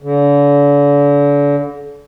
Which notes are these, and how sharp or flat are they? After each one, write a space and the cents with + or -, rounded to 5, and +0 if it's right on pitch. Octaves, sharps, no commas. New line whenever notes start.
D3 -40